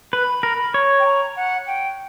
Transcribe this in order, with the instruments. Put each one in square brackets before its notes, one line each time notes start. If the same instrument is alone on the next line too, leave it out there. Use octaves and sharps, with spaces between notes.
[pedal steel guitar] B4 [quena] B5
[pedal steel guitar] A#4
C#5
[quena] G5
A#5
F#5
G5